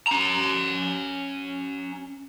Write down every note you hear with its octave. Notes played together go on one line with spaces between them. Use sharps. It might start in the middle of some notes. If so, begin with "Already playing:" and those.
C#4 A#5